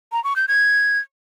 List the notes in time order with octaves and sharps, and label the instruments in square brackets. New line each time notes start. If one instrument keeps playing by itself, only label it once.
[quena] A#5
C#6
G6
G#6